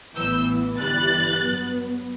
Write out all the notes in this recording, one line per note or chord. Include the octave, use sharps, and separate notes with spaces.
A1 A2 E3 B3 E6 G6
G1 G2 E3 G3 F#6 A6
G2 F#3 B3